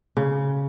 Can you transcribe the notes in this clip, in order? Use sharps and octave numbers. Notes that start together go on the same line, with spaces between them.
C#3